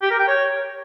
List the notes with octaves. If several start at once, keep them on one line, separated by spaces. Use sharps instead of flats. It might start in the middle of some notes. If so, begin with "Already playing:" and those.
G4
A#4
G5
C#5